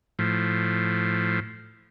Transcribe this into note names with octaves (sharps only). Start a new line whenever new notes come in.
A2 F3